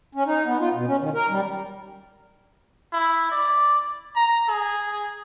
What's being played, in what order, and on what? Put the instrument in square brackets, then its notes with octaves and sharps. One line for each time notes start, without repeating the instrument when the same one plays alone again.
[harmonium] C#4
D#4
B3
F4
B2
C#4
D#3
A#4
G3
[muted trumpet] E4
D5
A#5
G#4